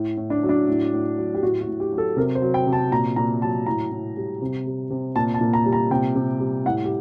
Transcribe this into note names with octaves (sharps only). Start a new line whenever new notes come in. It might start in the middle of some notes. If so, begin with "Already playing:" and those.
Already playing: A2
A2
D4
F#3
D4
A2
A2
F#3
G4
A2 F#4
F#4
A2
G4
F#3
A4
C3 A#4
C5
F#3
G5
C3
A5
A#2 A#5
A#2 A#5
F#3 A5
A2 A#5
A2
G3
C3
G3
C3
A#2 A5
A5
A#2
A#5
G3
A#5
C3 G5
C3
G3
A2 F#5
G4